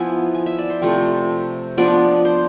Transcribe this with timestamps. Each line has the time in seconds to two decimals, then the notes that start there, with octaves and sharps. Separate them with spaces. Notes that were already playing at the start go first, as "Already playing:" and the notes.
Already playing: F3 B3 E4 G#5
0.34 G#5
0.46 E5
0.58 D5
0.70 C5
0.82 C3 F3 A3 C4
1.78 F3 B3 D4 D5
2.25 C5